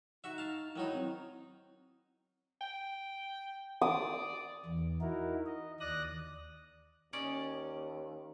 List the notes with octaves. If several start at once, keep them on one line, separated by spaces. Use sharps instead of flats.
D#4 F#4 E5
F5 A5
D#3 F#3 D#4 E4
C4
G5
D5 D#6
E2
D#4 E4 F#4 A#4
D#5
D#2 D5 D#6 F#6 A#6
D#2 C#4 D5 D#5